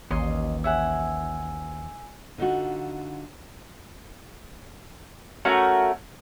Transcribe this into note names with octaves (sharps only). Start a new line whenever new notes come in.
A1 D#2 C#5 D#5 C6
C#5 E5 F#5 G#5 E6
D3 D#4 F4 F#4
A3 C#4 F#4 A#4